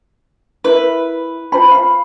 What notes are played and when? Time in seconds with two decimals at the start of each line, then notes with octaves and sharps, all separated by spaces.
0.64 E4 A#4 B4 E5
1.52 F4 C5 B5
1.71 F5 B5